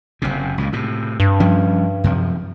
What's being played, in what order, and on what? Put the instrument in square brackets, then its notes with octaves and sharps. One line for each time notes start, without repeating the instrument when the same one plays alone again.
[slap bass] F#1 F#2 C3
C#2 A#2
A2 C3
[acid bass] G2
[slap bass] F3 G3 C#4
F#2 C3 F3